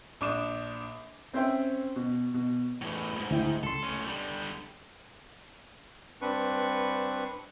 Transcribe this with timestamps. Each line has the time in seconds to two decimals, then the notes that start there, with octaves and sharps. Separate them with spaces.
0.21 A#1 D4 D6 D#6 E7
1.33 C4 C#4 C5 E5 G5
1.96 B2
2.34 B2
2.81 E2 A2
3.15 C#2 G#2
3.31 D2 E4 G5
3.63 C#2 A4 C6
3.83 A3 C#4
4.06 D3 G3
6.21 G2 C4 D4 B4 C#6